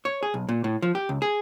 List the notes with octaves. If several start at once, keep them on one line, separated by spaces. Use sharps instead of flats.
C#5
G#4
B1
A#2
A2
F3
G4
C#2
G#4